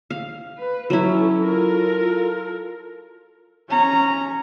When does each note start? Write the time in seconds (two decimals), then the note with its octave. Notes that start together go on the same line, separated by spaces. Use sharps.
0.10 F5
0.58 B4
0.90 F#3 C#4 E4 A4
1.43 F4 A4 A#4
3.69 C#4 A#5